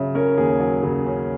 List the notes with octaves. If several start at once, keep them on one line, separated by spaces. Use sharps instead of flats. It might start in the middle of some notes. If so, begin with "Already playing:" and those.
Already playing: C#3 F#3 E5
C#4 A#4
D#2 G#4
F#3
C#3
C#4